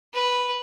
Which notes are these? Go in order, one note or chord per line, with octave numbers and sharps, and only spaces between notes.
B4